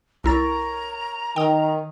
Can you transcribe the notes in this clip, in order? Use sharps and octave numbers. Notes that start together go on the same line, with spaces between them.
C2 E4 A#4 C#5 A#5 A6
D#3 G5 D#6